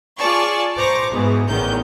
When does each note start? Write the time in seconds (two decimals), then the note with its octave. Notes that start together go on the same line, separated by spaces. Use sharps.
0.17 F4 G#4 D5 A5 C#6
0.78 C5 A#5 C#6 D6
1.11 G#2 B2 E3 G#4
1.48 A1 E2 D#3 C#4 G6